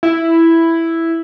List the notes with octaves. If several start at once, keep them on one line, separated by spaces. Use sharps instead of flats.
E4